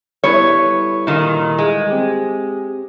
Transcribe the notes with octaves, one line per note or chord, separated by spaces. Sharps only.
G3 B3 E4 A4 C#5
A#2 D#3
G#3
C4 G4